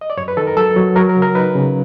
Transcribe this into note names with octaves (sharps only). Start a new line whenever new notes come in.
D#5
D5
F#2 C#5
B4
D#3 A4
A#4
F#3 A4
F#3
F#3 A#4
A#4
C#3
A#4
D#4 B4
C#3